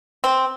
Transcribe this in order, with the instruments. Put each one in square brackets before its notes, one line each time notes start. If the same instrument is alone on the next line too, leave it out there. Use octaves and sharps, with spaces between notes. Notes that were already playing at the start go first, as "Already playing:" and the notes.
[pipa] C4